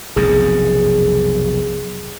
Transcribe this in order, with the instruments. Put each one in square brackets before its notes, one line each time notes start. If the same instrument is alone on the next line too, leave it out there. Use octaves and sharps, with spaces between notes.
[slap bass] F1 B1 F#2 [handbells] G#4